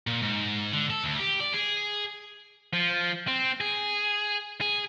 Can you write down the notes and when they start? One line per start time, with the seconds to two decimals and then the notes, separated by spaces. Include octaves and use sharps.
0.07 A#2
0.22 G#2
0.73 D3
0.90 A4
1.04 D2
1.19 G4
1.40 D5
1.53 G#4
2.73 F3
3.27 C4
3.61 G#4
4.61 G#4